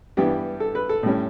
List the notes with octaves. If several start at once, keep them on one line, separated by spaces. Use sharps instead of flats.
G2 E3 G3 B3 G4
A4
B4
A4
A2 G3 C#4